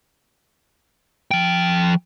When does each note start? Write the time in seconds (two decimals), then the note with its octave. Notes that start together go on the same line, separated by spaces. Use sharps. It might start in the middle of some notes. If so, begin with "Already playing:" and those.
1.31 F3 G5